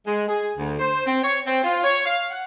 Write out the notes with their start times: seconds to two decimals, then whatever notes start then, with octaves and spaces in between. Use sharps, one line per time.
0.06 G#3
0.28 G#4
0.57 D2
0.79 C5
1.06 C4
1.23 C#5
1.46 C4
1.63 F4
1.84 C#5
2.05 F5
2.31 F#5